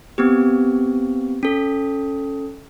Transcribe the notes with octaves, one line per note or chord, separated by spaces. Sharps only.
B3 C4 G4
C#4 A4